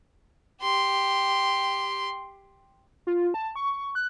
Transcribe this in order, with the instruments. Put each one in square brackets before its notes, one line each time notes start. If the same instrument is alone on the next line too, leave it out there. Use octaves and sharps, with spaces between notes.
[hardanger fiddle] G4 C6
[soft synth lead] F4
A5
C#6
F#6